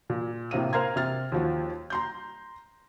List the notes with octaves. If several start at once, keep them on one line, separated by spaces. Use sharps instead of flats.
A#2
A2 C3 A#3 D#7
A#4 C5 F5 A#5 C6 G#6
C3 F6 A6
D#2 F3 F#4
A#5 C6 G6